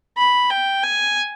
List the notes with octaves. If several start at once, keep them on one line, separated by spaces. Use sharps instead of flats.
B5
G5
G#5